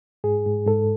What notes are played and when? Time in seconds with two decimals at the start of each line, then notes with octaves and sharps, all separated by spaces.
0.24 G#2 G#4
0.46 G#2
0.67 G#2 A4